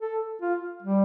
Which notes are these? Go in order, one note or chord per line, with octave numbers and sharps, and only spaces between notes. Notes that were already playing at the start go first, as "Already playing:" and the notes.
A4
F4
G3